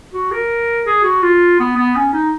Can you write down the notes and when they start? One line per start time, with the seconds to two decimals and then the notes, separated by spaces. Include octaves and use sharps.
0.13 F#4
0.31 A#4
0.86 G#4
1.04 F#4
1.23 F4
1.59 B3
1.77 B3
1.96 C#4
2.13 D#4